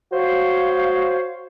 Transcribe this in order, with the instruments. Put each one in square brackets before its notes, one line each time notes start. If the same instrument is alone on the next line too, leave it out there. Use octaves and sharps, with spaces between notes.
[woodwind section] F#4 C5 C#5 F5